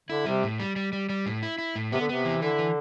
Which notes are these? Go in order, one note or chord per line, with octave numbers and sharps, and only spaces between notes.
D3 E4
C3 G3
A2
G3
G3
G3
G3
A2
E4
E4
A2
C3 B3
D3
C3 B3
E3
D3 E4
E3